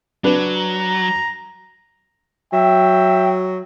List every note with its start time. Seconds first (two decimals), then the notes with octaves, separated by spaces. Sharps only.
0.24 F#3 D4 B4
0.57 A#5
2.53 F#3 E5 G5